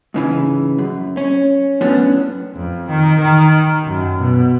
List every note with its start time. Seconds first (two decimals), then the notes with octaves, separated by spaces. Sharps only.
0.14 G#2 C#3 E3
0.78 F#2
1.17 C#4
1.81 F#2 A2 B3 C#4 D4
2.55 F2
2.89 D#3
3.21 D#3
3.83 F#2
4.20 B2